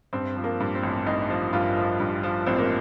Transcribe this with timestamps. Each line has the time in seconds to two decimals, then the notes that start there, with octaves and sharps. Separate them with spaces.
0.13 G2 C4
0.36 F3
0.44 A#3
0.60 G2
0.75 C4
0.83 A1
1.06 A1 D#4
1.30 F3
1.53 G2 F4
1.77 F3
2.00 G2
2.23 F3
2.46 A1 C4
2.59 A#3